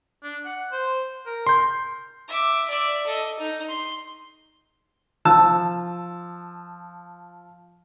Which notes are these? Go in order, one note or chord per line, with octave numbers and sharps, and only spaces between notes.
D4
F#5
C5
A#4
C6 G6
E5 D6
D5 E5
A4 D#5
D#4
C6
F3 A5 E6